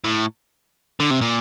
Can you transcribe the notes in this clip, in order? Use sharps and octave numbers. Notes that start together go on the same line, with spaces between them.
A2
D3
C3
A#2